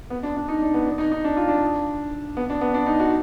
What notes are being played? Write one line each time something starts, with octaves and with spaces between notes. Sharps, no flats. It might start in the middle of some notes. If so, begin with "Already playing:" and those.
B3
D4
D4
D#4
D4
B3
D4
D#4
D#4
D4
F4
D4
B3
D4
B3
D4
D#4
F#4